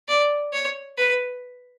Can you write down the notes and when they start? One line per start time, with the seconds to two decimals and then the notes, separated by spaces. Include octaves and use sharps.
0.08 D5
0.53 C#5
0.98 B4